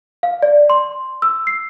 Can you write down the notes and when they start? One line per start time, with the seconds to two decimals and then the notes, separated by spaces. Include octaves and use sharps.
0.23 F5
0.42 D5
0.70 C6
1.22 E6
1.47 C7